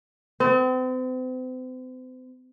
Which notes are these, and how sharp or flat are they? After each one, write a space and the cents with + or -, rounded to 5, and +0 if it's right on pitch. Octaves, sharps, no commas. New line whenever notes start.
C4 -40